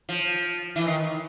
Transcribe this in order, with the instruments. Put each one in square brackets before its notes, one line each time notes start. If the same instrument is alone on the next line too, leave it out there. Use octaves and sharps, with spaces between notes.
[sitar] F3
E3
D#3